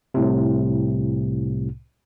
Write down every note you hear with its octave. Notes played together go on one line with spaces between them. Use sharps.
C2 A2 C3